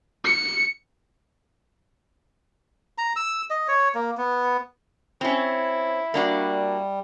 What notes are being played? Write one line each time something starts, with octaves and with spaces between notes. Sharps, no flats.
C#7
A#5
E6
D#5
C#5
A#3
B3
C4 C#4 E4
G3 A#3 D4 F#4